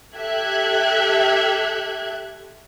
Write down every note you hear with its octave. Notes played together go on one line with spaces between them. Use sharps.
G4 A4 E5 F#6 G#6